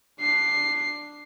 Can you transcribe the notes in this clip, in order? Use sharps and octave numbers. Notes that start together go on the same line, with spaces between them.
D4 C7